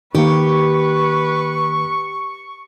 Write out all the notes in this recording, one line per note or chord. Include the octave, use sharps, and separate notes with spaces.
D#3 A#3 G4 B4 C#6